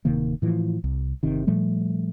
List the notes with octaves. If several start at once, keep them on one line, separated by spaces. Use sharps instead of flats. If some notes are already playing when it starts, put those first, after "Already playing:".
D1 C3 D#3 A#3
A2 E3 F3
C2
G1 C3 D#3
A#2 F3 G3 A3